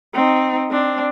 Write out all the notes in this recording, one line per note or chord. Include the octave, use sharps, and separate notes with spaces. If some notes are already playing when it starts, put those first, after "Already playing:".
C4 D#4
C4 D4